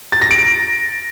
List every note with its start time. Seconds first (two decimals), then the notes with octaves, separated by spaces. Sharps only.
0.12 A6
0.22 A#6
0.31 D7